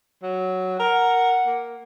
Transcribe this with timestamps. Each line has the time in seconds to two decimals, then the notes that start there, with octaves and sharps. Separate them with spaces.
0.23 F#3
0.79 A#4 F#5
1.46 A#3